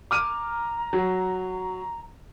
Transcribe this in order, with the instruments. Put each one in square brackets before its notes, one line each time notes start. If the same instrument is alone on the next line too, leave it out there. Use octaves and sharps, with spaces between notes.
[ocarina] A#5 [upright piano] D6 F6 D#7
[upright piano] F#3